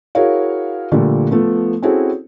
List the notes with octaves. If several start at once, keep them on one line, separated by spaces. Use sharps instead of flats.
E4 F#4 G#4 A#4 C#5 F5
A#2 D3 F3 G3 A3
F3 A3 B3
C4 C#4 E4 F#4 G#4 A4